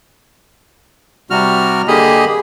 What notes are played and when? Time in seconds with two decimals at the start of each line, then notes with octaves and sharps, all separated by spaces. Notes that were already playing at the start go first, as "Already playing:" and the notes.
1.31 C3 G3 F#4 F6
1.88 D3 A#3 G4 G#4 D#5 B5
2.28 G#4